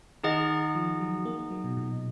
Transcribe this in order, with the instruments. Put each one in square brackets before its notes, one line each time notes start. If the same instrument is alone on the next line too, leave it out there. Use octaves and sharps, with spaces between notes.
[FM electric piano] D#3 [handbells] D#4 G#4 D#5 F#5
[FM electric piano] F3
F#3
A#3
F#3
B2
A#2